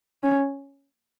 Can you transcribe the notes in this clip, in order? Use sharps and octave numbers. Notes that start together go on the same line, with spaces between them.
C#4